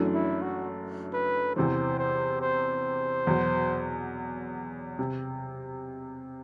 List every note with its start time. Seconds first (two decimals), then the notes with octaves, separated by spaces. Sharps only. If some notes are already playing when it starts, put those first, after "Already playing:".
Already playing: F#1 F#2 E3 A3 D4
0.14 E4
0.42 F#4
1.14 B4
1.56 E2 C3 E3 C5
1.99 C5
2.42 C5
3.27 E2 B2 F#3
4.99 C3